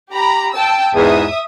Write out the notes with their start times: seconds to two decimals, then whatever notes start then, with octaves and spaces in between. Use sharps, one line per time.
0.11 G4 A#5 B5
0.53 G5 A5 E6
0.95 E2 G#2 E5 D#6